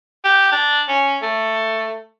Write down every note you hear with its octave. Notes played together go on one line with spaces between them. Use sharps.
G4
D4
C#4
A3